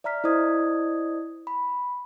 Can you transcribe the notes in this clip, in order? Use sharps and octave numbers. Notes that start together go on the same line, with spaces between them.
D5 E5 A#5 F6 B6
E4 C5 D5 D#5 D#6 G#6
B5